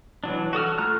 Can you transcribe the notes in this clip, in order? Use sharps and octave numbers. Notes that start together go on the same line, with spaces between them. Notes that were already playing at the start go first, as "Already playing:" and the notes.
E3 F#3 D4
F#4 A4 D#6 F6
A3 F4 A#5 F6 F#6